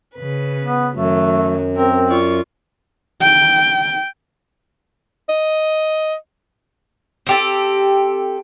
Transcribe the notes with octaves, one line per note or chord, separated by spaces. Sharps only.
C#3 B4
B3
F#2 D#3 F#3 A3
C4 A#4
F4 D5 C#6
G5
D#5
C4 G4 A4